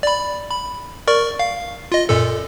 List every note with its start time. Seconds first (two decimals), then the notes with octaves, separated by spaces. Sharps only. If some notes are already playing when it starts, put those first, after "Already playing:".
0.03 D5 B5
0.50 B5
1.07 A#4 D5 C#6
1.39 F5
1.92 F4 D#5
2.09 F#2 A#2 A4